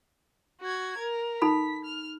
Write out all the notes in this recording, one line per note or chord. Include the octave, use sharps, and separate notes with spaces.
F#4 G#6
A#4
D#4 A4 B5 B6
F6